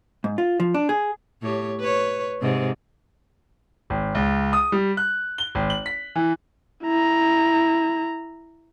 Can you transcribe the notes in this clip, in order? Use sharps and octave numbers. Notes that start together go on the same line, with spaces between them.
G#2
F4
F3
D4
G#4
A2 G4 C#5
B4 C#5
G#2 C3
G#1
C#2
D#6
G3
F#6
G7
G#1
F#7
B6
E3
E4 A#5